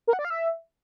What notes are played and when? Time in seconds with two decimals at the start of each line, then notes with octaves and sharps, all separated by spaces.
0.07 A#4
0.13 F#5
0.19 D5
0.25 F5
0.30 E5